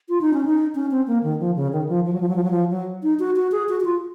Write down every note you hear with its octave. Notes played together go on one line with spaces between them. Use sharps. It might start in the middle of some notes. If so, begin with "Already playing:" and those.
F4
D#4
C#4
D#4
C#4
C4
A#3
D#3
F3
C#3
D#3
F3
F3
F#3
F3
F#3
F3
F#3
F3
F#3
D#4
F#4
F#4
G#4
F#4
F#4
F4